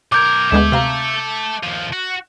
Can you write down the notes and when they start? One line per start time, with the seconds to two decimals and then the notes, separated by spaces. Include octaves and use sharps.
0.12 B1 A#4 D6 G6 G#6
0.52 D2 G#3 B3 A4 E5
0.72 C3 F5 A#5
1.63 D#2 F3
1.93 F#4